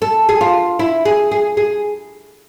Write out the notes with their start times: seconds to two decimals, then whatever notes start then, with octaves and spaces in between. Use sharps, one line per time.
0.02 A4
0.29 G#4
0.41 F4
0.79 E4
1.05 G#4
1.31 G#4
1.57 G#4